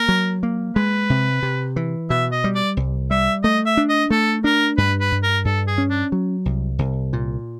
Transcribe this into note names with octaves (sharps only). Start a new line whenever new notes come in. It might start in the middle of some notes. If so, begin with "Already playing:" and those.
Already playing: A#3 A#4
F#3
A#3
G#3 B4
C3
C3
E3
B2 E5
D#5
G3
D5
C2
G3 E5
A3 D#5
E5
D4
D#5
A3 A4
D4 A#4
G2 B4
B4
G2
A#4
G2 A4
G#4
C#4
D4
F#3
C2
C2
A#2